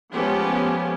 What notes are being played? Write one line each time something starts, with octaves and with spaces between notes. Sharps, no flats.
F3 G#3 A3 B3 C#4 G4